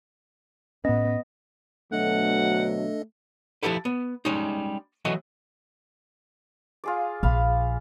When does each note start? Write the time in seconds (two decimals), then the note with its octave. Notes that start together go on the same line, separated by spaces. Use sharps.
0.85 A2 B3 C#4 D#5
1.92 D2 B2 F#3 A3 D4 A4 D#5 F#5
3.63 F3 F#3 E4 G4 A4 B4
3.85 B3
4.25 G3 G#3 C#4 D#4
5.05 E3 F#3 A3 F#4 D#5
6.84 F4 G#4 D5
7.23 A#1 F5 B5